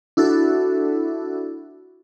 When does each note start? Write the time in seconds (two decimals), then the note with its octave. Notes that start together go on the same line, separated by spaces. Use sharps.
0.17 D4 E4 F#4 A4